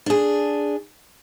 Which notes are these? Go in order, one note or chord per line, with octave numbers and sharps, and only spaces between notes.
D4 G#4